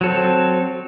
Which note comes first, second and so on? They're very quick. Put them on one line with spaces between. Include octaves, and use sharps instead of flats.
F#3 A4 C4